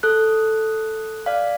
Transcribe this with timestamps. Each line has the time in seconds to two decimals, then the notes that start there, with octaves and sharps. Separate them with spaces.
0.03 A4 F#6
1.26 D5 F5